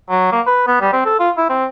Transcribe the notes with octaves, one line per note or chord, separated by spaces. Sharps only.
F#3
A#3
B4
B3
G3
C4
A4
F4
E4
C4